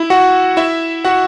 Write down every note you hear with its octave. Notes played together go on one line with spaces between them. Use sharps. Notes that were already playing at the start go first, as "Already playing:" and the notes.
Already playing: E4
F#4 F#5
E4 E5
F#4 F#5